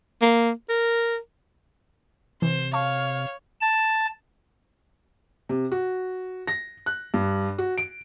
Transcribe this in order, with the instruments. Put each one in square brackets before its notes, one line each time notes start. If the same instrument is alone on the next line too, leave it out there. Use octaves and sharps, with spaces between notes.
[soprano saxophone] A#3
A#4
[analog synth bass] C3 [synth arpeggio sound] E3 [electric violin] C5
[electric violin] C#5 [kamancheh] F5 [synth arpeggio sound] A5 C#6
[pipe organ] A5
[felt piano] C3
F#4
A#6
F#6
G2
F#4
D7